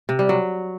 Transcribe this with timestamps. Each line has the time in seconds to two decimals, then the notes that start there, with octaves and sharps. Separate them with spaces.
0.09 C3
0.19 G3
0.29 F#3